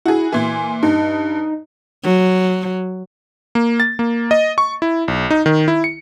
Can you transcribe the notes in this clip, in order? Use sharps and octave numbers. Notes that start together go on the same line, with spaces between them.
E4 F#4 G#4
A#2 E3 G#5
G2 D#4
F#3
A#3
A6
A#3
D#5
C#6
E4
B1
D#4
D#3
E4
C#7